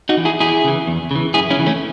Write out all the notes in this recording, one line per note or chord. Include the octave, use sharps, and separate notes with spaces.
D#4 F#4
E3
E4 G#4
E2 E4 G#4
C#3 E3
E2
C#3 E3
F#2 E4 G#4
C#4 E4
C#3 E3
A3 C#4